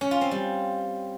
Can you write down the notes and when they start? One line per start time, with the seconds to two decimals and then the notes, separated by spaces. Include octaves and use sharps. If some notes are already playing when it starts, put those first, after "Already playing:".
0.01 C#4
0.11 F4
0.21 C4
0.31 G3